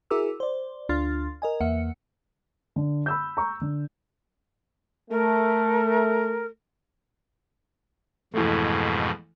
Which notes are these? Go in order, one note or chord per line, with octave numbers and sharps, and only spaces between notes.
E4 F#4 G#4 A#4 D6 E6
C5 D5
D2 D4 F4 C6 F6 A6
A#4 D#5 G#5
E2 A#3 E5 F#5 C#7
D3
B5 E6 G6
A#5 C#6
D3
A3 A#4
F2 G#2 B2 E3 A3